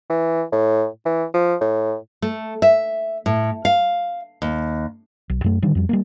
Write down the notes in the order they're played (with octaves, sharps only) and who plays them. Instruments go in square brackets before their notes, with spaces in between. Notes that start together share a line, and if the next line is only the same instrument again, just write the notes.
[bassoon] E3
A2
E3
F3
A2
[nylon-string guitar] A3
E5
A2
F5
D#2
[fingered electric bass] B1
F#2 A3
D3 D#3 G3
F2 G3
G3 A3 A#3